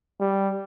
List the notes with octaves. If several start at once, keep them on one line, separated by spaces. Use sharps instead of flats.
G3